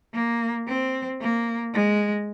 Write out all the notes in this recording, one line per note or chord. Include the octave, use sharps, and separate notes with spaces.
A#3
C4
A#3
G#3